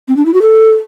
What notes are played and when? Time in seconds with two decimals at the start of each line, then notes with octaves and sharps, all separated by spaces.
0.08 C4
0.17 D4
0.26 E4
0.34 F#4
0.42 A4